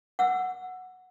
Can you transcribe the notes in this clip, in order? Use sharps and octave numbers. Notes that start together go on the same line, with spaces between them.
F#5 E6